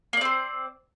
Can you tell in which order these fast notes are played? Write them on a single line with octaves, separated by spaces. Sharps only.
A#3 D5 C4 C5